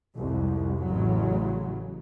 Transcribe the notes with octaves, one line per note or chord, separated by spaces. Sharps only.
C2 F2 G#2
A1 C#3 F#3